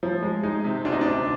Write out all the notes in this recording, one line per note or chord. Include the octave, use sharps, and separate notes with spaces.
F3
G#3
G#3 D#4
C3
D2 D4
D#4
D4
C3